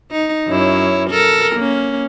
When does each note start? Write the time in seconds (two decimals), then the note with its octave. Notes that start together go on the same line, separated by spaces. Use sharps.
0.12 D#4
0.48 F#2 E4 C#5
1.10 A4 A#4
1.56 A#3 C#4